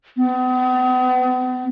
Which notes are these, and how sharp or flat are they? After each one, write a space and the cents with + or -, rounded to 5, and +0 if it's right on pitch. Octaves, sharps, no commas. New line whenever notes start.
B3 +40